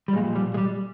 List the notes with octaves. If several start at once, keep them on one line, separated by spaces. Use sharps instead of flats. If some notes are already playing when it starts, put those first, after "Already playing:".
G3
A#2 F3 G#3
G3
G#3
G3